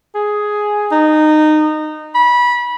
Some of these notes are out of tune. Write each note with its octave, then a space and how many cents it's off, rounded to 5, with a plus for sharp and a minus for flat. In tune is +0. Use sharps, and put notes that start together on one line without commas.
G#4 +5
D#4 -20
B5 -20